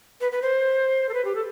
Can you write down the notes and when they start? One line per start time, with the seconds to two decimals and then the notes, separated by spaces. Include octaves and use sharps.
0.21 B4
0.32 B4
0.42 C5
1.09 A4
1.14 B4
1.25 G4
1.35 A4